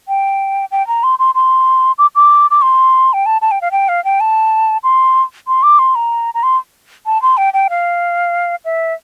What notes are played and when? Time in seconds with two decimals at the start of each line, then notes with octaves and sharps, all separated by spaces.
0.08 G5
0.71 G5
0.87 A#5
1.03 C6
1.19 C6
1.35 C6
1.98 D6
2.16 D6
2.51 D6
2.62 C6
3.13 G5
3.26 A5
3.42 A5
3.51 G5
3.61 F5
3.72 G5
3.89 F5
4.05 G5
4.20 A5
4.84 C6
5.48 C6
5.63 D6
5.79 C6
5.95 A#5
6.34 A#5
6.43 C6
7.06 A5
7.22 C6
7.37 G5
7.54 G5
7.70 F5
8.65 E5